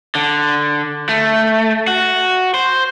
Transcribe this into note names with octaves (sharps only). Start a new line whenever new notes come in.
D3
A3
F#4
C5